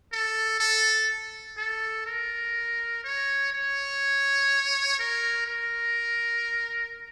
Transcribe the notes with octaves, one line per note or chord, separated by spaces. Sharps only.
A4
A4
A4
A#4
C#5
C#5
A#4
A#4